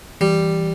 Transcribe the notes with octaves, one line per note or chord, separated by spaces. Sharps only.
E3 G3